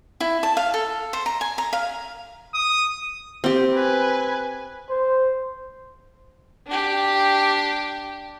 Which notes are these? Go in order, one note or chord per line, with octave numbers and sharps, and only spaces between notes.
E4
A5
F5
A4
C5
A#5
G#5
A#5
F5
D#6
C4 G4
B4 G#5
C5
D4 G4